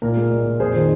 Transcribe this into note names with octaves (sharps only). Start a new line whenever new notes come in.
A#2 A#4
G#3
A#2
A#2
F2 G#4 C5
D#3